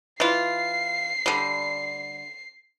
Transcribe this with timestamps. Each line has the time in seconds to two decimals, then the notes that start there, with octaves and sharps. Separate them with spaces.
0.20 E3 F4 C7
1.26 D3 G3